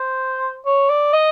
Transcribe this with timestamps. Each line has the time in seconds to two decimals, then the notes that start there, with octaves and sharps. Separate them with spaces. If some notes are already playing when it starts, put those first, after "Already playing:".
Already playing: C5
0.66 C#5
0.89 D5
1.13 D#5